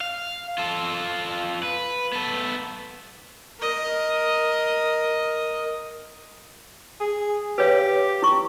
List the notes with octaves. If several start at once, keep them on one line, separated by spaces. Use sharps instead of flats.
F5
F4 A4
B4
B3 A4
A#4 D#5
G#4
G4 B4 C#5 F5
E4 C#6